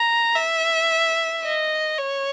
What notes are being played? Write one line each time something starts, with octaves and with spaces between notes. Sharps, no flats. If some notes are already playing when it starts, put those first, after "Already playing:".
Already playing: A#5
E5
D#5
C#5